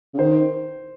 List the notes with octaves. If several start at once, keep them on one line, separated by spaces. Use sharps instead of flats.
C#3
D#3 C5